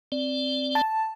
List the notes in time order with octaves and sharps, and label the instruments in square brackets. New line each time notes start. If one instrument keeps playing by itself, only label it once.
[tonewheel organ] C4 D5
[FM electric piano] A5